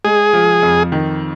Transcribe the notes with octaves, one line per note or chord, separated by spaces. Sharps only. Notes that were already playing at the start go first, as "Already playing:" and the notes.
G#3 G#4
F3
F2
D#3